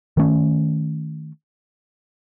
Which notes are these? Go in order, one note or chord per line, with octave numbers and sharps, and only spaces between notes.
D#3 A3 C#4